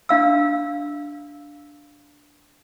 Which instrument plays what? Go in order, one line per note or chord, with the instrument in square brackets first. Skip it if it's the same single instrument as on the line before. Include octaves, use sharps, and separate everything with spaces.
[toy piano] D4 F5 E6